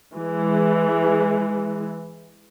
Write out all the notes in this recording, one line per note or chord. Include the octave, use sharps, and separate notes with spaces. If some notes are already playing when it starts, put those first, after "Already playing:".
E3 G#3